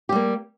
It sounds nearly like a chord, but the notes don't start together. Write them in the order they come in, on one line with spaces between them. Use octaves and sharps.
G4 G3 A#3